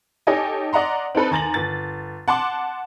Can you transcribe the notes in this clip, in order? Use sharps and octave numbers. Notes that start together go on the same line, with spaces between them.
D#4 G4 A4 C#5 D#5 G#5
D5 D#5 F#5 A#5 C6
C4 D#4 A4 B4
D#2 G#5 A#5 A6 A#6 F#7
G1 A6
F#5 A5 C6 D6